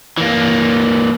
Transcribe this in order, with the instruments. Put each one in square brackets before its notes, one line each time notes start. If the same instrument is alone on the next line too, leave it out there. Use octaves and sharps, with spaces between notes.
[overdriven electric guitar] E3 A#3